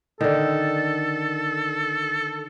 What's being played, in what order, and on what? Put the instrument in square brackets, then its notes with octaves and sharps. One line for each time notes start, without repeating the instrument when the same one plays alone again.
[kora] D3 D#3 [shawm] A4